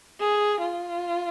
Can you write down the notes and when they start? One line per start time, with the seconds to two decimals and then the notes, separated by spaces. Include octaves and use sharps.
0.20 G#4
0.61 F4